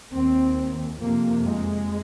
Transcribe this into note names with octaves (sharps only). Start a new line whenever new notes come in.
D#2 C4
F2 C3 A#3
G#3